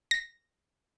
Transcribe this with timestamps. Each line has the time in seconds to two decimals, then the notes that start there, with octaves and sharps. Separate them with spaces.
0.11 A#6